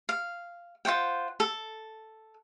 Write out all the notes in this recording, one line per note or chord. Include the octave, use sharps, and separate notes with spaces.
F5
F4 C5 F#5 G5
A4